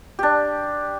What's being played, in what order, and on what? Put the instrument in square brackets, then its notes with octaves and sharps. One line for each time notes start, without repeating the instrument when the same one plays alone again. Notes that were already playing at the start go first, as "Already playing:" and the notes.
[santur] D4 G4